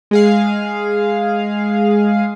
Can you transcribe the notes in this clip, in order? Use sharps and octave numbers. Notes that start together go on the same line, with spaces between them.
G#3 G#4 F5